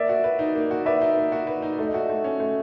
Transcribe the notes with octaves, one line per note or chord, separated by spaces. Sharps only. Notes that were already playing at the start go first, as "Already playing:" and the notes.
Already playing: A#3 D5 E5
F#4
B4
D#4
A#3
F#4
B4 D5 E5
D#4
A#3
F#4
B4
D#4
A3 E5
D#5
F#4 D5 E5
A3
C#4
A3